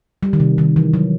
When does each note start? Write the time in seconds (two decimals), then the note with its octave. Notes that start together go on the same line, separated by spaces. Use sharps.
0.23 G3
0.33 D#3
0.40 C3
0.58 D#3
0.76 E3
0.94 F#3